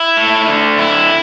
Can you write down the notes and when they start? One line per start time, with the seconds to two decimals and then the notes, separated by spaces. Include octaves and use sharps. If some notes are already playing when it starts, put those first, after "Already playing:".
Already playing: E4
0.17 A3
0.47 D3
0.78 E4